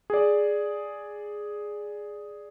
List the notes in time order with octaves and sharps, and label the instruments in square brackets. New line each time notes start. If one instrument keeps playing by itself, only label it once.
[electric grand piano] G#4 D5